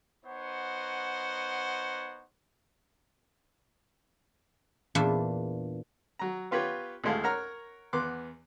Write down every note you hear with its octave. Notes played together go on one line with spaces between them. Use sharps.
B3 D#4 C5 C#5 F#5
E2 A#2 D4 E5
F#3 A#5
B3 F4 G4 B4 C#5
D2 A2 G#3 A3 F5
A#4 C#5 F#5 A#5 F6
E2 B3 C6 D6 F#6